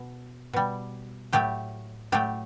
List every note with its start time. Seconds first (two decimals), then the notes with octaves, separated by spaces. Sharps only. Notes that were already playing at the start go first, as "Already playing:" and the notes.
Already playing: B2
0.53 B2 G3
1.33 A2 F#3 A3 G4
2.12 A2 F#3 A3 G4